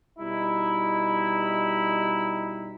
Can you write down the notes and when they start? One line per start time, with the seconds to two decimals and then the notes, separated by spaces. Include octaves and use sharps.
0.19 B2 G3 D#4 E4